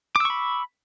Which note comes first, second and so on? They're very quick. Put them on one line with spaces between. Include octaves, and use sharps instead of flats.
D6 E6 C#6 B5